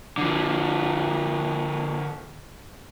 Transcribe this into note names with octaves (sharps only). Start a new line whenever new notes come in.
D3 F3